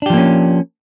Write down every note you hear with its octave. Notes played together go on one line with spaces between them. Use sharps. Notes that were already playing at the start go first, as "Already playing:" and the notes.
F3 A#3 C#4 D4 G4